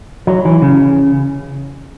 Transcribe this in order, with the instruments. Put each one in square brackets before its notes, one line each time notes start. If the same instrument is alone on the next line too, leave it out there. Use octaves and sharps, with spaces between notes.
[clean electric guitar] F#3
E3
C#3